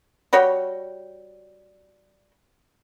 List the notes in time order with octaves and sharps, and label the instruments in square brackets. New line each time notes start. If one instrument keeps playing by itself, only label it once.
[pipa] G3 F#4 C#5 G5